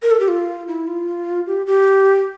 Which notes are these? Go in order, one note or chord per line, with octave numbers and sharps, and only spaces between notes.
A#4
A4
G4
F4
E4
F4
G4
G4